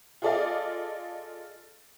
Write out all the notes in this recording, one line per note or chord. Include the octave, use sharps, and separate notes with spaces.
F4 G#4 A4 D5 D#5 F5